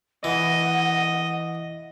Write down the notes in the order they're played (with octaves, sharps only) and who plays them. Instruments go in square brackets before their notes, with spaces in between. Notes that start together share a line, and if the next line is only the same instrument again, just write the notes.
[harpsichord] E3 [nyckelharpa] D#5 [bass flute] F#5